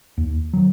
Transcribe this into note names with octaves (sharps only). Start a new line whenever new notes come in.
D#2
D#3 F#3